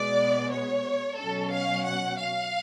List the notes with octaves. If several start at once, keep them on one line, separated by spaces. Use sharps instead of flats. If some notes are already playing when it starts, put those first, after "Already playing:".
Already playing: B2 G#3 B3 D5
C#5
B2 F#3 C#4 A4
F5
F#5
F5